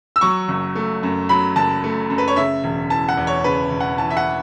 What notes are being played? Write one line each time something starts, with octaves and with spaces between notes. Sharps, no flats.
E6
F#3 C#6
F#1
A3
F#2
F#3 B5
F#1 A5
A3
F#2
B4
C#5
C#3 E5
E1
E3 A5
F#5
E2
C#5
C#3 B4
E1
F#5
E3 A5
E5
F#5